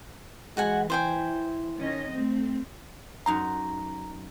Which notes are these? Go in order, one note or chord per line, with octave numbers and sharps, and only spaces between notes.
E3 G#3 F#4 F#5 G#5
E4 C5 G5 G#5
D#3 C#4 D#5
A3 C4
F#2 D#4 A#5 C6